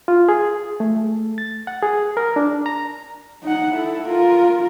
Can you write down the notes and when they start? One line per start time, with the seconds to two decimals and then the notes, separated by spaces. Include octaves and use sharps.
0.08 F4
0.29 G#4
0.80 A3
1.38 A6
1.67 F#5
1.83 G#4
2.17 A#4
2.36 D4
2.66 A#5
3.43 D#4 F#5
3.72 E4 A4
4.09 F4 A#4